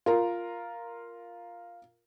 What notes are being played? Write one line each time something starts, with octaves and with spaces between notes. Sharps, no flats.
F4 A#4 A#5